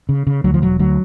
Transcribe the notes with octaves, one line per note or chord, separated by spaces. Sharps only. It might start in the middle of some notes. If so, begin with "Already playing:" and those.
C#3
C#3
D2 F#3
F3
E1 F#3
D2 F#3